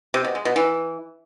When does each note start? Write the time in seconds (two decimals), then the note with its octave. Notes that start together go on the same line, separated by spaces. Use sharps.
0.14 C3
0.24 B2
0.35 G#3
0.45 B2
0.56 E3